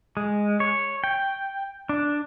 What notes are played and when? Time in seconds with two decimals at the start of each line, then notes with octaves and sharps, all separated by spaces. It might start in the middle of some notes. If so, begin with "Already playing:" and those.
0.17 G#3
0.60 C#5
1.04 G5
1.89 D4